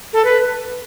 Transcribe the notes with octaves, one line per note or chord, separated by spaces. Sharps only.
A4
B4